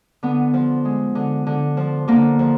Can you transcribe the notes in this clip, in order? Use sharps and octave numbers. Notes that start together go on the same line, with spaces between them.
D3 B3
F3
G#3
D3
D3
F3
D3 A#3
F3